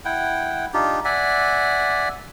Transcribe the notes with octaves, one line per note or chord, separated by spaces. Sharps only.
E4 F#5 G5
D4 D#4 F4 G4
D5 E5 F#5 G#5